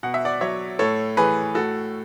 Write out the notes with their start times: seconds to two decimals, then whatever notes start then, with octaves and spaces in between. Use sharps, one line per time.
0.03 B2 F#5
0.14 E5
0.25 D5 F#5
0.41 F#3 C#5 E5
0.79 A2 A4 C#5
1.17 E3 G#4 B4
1.55 A2 F#4 A4